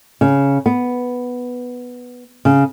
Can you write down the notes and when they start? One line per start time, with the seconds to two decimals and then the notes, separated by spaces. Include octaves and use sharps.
0.21 C#3
0.66 B3
2.45 C#3